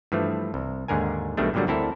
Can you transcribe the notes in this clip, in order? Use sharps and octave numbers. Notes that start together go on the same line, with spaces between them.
G2 E3 F3 A3
C2
D#2 G#2 D3 A#4 G#5
B1 B2 D#3 G3 A3 D4
G2 A#2 D3 F#3 G3
D2 C4 E4 A4 A#4